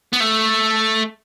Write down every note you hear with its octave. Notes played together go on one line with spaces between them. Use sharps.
B3
A3